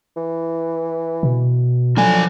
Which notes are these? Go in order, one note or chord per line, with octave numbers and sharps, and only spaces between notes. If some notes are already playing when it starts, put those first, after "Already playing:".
E3
B2
D3 F3 F#3 G#5